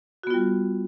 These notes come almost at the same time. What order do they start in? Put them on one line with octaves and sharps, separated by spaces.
F#4 B3 F4 G3